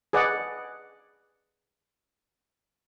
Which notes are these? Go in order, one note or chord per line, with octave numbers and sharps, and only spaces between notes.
G#4 B4 D5 D#5 F#5